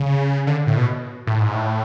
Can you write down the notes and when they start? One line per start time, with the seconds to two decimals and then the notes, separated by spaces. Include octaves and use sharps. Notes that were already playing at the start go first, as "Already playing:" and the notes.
Already playing: C#3
0.47 D3
0.67 A2
0.77 B2
1.27 A2
1.40 G#2
1.54 A2